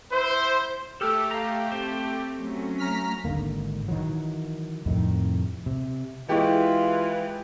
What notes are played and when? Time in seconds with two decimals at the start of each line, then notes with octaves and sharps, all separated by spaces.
0.10 E4 C5
1.01 A3 G4 A4 E6 F6
1.31 F5 A#5
1.72 C4 C5
2.37 F#3 A3 C#4
2.78 A#5 F6 B6
3.25 G#1 G#2 D3 A#3
3.88 D#3 E3 F#3
4.86 F2 A2 C3 D#3
5.66 C3
6.29 E3 G#3 E4 F4 G4 G#4